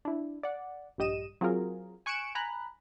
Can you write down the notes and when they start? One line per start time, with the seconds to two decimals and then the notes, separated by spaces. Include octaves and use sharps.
0.05 D4 E4
0.43 D5 F#5
0.98 A#1 G2 G3 D#5 D#7 E7
1.41 F#3 C4 F4 G#4 A#4
2.06 G#5 C#6 F#6 C#7 D7 E7
2.35 G#5 A#5 B5 F#6